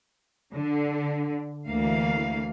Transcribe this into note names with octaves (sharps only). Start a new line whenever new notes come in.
D3
D2 E3 A3 A#3 F5